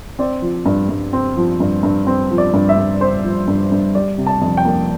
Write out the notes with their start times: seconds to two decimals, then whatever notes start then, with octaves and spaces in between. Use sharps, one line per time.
0.19 C4 D5
0.42 F3
0.66 G2
0.89 G2
1.13 C4
1.37 F3
1.60 G2
1.83 G2
2.07 C4
2.31 F3
2.38 D5
2.54 G2
2.69 E5
2.77 G2
3.01 C4 C5
3.24 F3
3.48 G2
3.72 G2
3.95 G3 D5
4.18 C3
4.27 A5
4.42 F2
4.57 G5
4.65 A#3